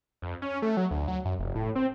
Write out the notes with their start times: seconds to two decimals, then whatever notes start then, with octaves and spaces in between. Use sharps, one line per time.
0.22 F2
0.42 C#4
0.62 A3
0.77 F#3
0.91 D2
1.08 F#3
1.25 F#2
1.39 F1
1.55 A2
1.75 C4